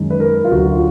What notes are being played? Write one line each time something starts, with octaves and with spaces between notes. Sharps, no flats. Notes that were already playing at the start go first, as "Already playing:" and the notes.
Already playing: F#2 D#3 G#3
B4
A#4
F4
D2 D3 F#3 F#4
F4